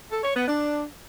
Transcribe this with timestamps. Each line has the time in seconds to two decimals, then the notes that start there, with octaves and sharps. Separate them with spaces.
0.11 A4
0.23 C#5
0.35 B3
0.47 D4